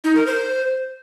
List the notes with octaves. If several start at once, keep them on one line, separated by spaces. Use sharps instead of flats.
D#4
A#4
C5